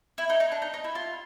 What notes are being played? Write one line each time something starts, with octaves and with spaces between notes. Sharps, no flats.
E4
D#4
D#4
D4
D#4
D#4
E4
F4